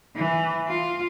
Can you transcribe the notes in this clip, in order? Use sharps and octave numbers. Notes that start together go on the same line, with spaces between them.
E3
F4